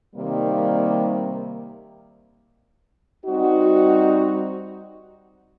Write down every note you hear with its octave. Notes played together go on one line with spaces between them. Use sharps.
C3 D#3 G3 A#3
G3 C4 D#4 F#4